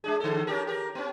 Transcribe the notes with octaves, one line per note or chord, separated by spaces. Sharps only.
G#3 D4 G#4
D3 A4
C#4 G4 A#4
G4 A#4
B3 C#4